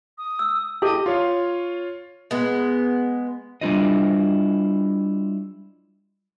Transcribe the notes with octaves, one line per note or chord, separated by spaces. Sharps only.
D#6
E6
E4 G4 A4 D#5
F4 C#5 F5
G#3 B3
G3 D4 E4 F4 C5 D#5